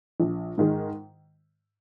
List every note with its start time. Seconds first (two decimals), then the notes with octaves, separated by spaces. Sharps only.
0.20 A#1
0.58 G#2 D#3 G#3